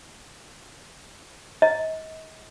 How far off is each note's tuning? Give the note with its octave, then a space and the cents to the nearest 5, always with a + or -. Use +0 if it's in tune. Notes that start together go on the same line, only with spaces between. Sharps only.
D#5 +35